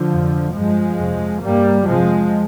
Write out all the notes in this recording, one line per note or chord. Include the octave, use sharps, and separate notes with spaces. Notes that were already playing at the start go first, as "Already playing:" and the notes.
Already playing: D3 F3
F2 C3
G2 F3 G#3
F2 C3
G2 G3 A#3
F2 C3 F3 G#3